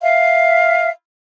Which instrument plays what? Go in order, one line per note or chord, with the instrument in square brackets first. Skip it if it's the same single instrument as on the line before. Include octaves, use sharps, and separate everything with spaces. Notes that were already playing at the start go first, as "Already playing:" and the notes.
[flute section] E5 F5